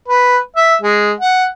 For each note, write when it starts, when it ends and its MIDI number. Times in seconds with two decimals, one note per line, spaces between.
0.08 0.37 71
0.56 0.75 76
0.82 1.12 56
1.20 1.45 78